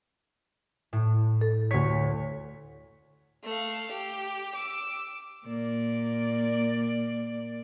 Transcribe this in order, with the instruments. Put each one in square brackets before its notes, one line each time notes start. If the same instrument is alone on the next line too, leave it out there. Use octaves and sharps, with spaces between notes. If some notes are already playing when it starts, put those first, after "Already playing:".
[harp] A2
[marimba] A4
[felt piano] D2 B6 [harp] C#5
[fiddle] A3 F5
G4
D6 E6
[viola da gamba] A#2 A#3 D5